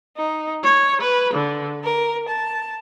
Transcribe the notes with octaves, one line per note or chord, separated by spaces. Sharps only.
D#4
C#5
B4
D3
A#4
A5